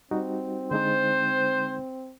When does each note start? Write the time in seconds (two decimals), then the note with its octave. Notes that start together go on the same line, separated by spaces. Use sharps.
0.11 G3 C4 D#4 F#4
0.71 D3 G#3 D#4 C5